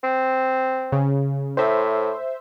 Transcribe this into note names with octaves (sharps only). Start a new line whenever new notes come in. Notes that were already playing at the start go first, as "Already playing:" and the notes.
C4
C#3
A2 C5 E5